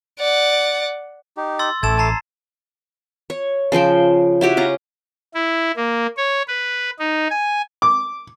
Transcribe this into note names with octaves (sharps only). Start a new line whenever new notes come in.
D5 F#5
D#4 G4
C6 E6 A6
A1 A3 A4 D6 G#6 A6 E7
A5 A#5 C7
C#5
C#3 F3 C5 G5
E4 F#4 G4 C#5
C#4 F4 A#5
E4
A#3
C#5
B4
D#4
G#5
D6